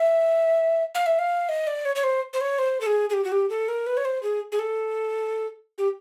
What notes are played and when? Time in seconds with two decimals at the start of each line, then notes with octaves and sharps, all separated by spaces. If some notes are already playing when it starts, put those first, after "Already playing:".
Already playing: E5
0.95 F5
1.06 E5
1.19 F5
1.49 D#5
1.67 D5
1.85 C#5
1.96 C#5
2.04 C5
2.33 C5
2.41 C#5
2.59 C5
2.81 A4
2.86 G#4
3.10 G#4
3.14 G4
3.24 F#4
3.32 G4
3.50 A4
3.68 A#4
3.87 B4
3.97 C#5
4.05 C5
4.23 G#4
4.52 G#4
4.59 A4
5.78 G4